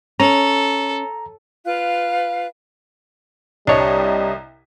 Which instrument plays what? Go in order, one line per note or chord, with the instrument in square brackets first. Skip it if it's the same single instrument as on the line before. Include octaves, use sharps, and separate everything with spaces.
[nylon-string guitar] C#4 [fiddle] A4 [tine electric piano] A#5
[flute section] F4 B4 F5 F#6
[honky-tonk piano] C2 D#5 [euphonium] G3 [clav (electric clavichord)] D4 C#5